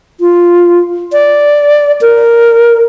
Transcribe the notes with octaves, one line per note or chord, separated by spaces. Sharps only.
F4
D5
A#4